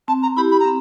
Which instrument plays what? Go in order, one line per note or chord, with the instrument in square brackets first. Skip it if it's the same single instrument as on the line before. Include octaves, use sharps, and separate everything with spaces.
[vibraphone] C4 [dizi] A5
[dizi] A#5
[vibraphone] E4 G4 [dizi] B5
[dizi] B5
A#5
[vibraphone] C4